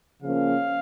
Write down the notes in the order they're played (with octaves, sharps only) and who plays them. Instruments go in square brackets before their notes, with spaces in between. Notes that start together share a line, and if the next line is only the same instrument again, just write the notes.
[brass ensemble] C#3 F3 A#3 C#4 F5